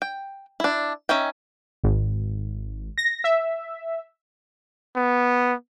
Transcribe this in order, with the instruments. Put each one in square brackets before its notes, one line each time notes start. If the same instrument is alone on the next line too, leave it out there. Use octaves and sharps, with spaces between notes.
[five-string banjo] G5
D4 E4
C#4 D#4 E5 G5
[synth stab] G#1
A#6
E5
[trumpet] B3